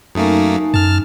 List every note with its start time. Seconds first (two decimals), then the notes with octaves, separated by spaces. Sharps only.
0.15 F#2 A3 A#3 D#4 G#5
0.74 F#2 A5 F6